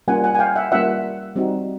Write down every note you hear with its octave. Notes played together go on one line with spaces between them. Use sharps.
G3 A#3 C#4 F4 F#5 G#5
F#5 G#5
G#5
F5 G5
E5 F#5
G3 A#3 C#4 F4 E5 F#5
G3 C4 D#4 F#4